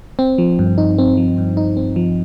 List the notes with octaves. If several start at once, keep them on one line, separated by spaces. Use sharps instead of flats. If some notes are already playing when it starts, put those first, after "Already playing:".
C4
F3
G2
D#4
C4
F3
G2
D#4
C4
F3